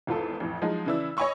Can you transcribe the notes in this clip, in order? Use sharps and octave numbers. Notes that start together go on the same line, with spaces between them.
G#1 E2 F4 A4
A1 F2
F3 F#3 G#3 D#4
C#3 E3 E4 D5 E6
C#5 D#5 G#5 B5 C#6 E6